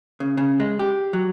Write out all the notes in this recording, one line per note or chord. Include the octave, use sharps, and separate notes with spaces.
C#3
C#3
G#3
G4
F#3